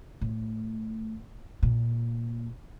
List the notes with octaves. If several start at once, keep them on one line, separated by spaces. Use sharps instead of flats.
A2
A#2